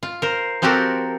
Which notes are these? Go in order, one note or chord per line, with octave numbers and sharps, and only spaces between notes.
F4
A#4 C5
F3 C4 F#4 G4 A4 A#4